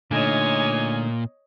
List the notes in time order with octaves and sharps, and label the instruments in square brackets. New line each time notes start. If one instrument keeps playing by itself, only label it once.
[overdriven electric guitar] A#2 [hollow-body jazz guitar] D3 A3 D#4 [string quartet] C#5 D#5 [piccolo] G#5